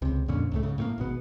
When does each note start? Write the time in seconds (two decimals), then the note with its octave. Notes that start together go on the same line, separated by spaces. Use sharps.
0.02 C#2 C3
0.28 F2 A#2 D3 C#4
0.52 C#2 A2 A3
0.63 G#2 C#3
0.78 A2 A3 A#3
0.98 G#1 B2 B3